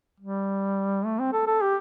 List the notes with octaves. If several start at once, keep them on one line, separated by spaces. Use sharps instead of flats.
G3
A3
C4
A4
A4
G4